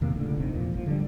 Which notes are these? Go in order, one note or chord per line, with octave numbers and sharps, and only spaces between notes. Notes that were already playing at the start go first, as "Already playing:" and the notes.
E2 C3 D#3 A#3
C#2 A2 D3
F#1 D2 C3 D#3
E2 A#2 F3
G#1 F3
D3 D#3 G3